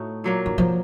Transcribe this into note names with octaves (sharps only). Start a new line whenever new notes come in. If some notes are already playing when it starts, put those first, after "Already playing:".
Already playing: A2 A3 D#4 F#4
A#2 F#3 A#3
D#3
F3